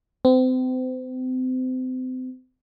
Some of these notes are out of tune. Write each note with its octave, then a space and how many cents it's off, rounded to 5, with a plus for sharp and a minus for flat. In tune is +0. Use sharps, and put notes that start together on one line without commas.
C4 -35